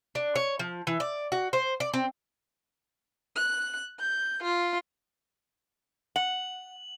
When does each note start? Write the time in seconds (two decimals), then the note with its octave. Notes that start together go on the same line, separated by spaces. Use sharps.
0.15 D4
0.35 C#5
0.59 F3
0.87 E3
1.00 D5
1.32 F#4
1.53 C5
1.80 D5
1.94 C4
3.36 F#6
4.00 G6
4.43 F4
6.16 F#5 F#7